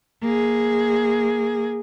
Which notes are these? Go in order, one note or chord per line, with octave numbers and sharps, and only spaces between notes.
A#3 G#4